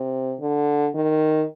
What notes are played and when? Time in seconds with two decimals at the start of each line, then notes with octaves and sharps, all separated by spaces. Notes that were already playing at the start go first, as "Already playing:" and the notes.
Already playing: C3
0.40 D3
0.95 D#3